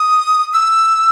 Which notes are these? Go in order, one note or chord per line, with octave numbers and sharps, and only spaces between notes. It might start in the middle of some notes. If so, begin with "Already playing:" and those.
Already playing: D#6
E6